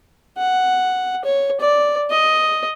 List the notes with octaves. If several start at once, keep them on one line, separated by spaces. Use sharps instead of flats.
F#5
C#5
D5
D#5